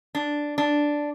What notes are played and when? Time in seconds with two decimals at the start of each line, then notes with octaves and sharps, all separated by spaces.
0.15 D4
0.58 D4